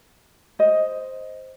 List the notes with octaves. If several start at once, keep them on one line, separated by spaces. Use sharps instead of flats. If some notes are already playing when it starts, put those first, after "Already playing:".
C5 D#5